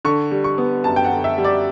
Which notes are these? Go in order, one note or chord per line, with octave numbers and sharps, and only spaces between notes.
D3 C#6
G3
C#6
B3
F#2 A5
G5
F#5
D3
E5
G3
D5